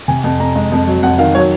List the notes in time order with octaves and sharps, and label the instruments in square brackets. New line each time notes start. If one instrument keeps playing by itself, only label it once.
[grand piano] C3 G#5
F2
F2 A#5
G#3
F2
F#3
F2 F#5
D#3 F5
F#3 C#5